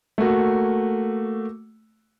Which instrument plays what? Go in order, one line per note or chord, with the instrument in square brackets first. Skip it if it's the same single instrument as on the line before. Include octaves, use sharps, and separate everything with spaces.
[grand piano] A3 A#3 F#4